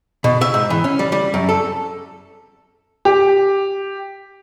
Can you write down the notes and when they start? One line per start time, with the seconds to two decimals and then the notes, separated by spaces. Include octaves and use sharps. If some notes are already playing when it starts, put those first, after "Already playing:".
0.24 B2
0.41 E5
0.54 G#2
0.70 E3
0.84 C#4
0.99 G3
1.12 G3
1.34 F#2
1.49 A4
3.05 G4